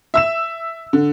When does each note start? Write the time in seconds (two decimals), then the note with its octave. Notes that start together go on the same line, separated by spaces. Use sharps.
0.14 E5 E6 E7
0.93 D3